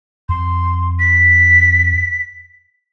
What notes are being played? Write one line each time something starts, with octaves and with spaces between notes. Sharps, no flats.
F2 C6
B6